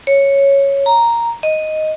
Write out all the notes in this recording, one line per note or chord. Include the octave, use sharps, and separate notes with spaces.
C#5
A#5
D#5